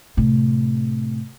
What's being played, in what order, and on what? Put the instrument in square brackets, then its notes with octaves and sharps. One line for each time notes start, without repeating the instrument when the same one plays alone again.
[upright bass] A2 C3